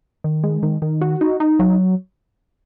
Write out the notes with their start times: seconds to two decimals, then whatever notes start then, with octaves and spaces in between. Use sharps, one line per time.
0.24 D#3
0.44 G#3
0.63 D#3
0.82 D#3
1.01 F#4
1.21 D#4
1.40 D#4
1.59 F#3